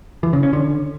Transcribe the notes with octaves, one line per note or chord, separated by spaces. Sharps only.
E3
C#3
C#4
D3